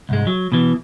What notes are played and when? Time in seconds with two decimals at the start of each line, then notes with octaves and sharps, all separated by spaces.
0.09 C2 G#2 G#3
0.27 F#3
0.52 B2 E3